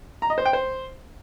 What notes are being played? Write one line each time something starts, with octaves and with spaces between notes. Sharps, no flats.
A#5
D#5
C5
G5
C5